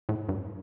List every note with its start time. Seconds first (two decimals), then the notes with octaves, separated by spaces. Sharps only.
0.09 A2
0.29 G2